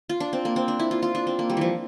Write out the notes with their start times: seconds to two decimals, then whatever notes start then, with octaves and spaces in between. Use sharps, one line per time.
0.09 F4
0.20 D4
0.33 C4
0.45 A#3
0.56 C4
0.68 D4
0.79 E4
0.91 F4
1.03 F4
1.15 D4
1.27 C4
1.39 A#3
1.50 G3
1.57 E3 F3